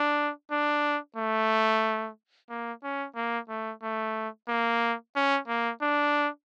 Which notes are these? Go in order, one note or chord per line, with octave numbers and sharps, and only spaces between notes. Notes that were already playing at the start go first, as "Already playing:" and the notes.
Already playing: D4
D4
A3
A#3
C#4
A#3
A3
A3
A#3
C#4
A#3
D4